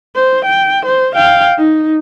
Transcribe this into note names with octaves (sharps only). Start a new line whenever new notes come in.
C5
G5
C5
F5 G5
D#4